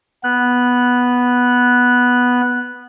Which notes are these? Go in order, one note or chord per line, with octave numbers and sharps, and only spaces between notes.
B3 F#6